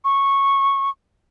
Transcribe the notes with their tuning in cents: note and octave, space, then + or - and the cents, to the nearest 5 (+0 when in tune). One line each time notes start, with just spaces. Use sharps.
C#6 -10